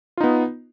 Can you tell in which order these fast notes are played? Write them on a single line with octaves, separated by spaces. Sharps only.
F4 D#4 B3